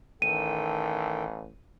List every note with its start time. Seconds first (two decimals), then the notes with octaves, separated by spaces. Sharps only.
0.22 A1 D#3 A4 G5 D#7